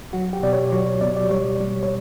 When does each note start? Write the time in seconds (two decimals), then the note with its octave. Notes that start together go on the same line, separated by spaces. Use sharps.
0.13 F#3 F#4
0.33 G4
0.43 B2 D5
0.53 C#5
0.72 F#3 C#5
0.86 C#5
1.01 B2 D5
1.17 D5
1.31 G3 C#5
1.60 G3
1.83 C#5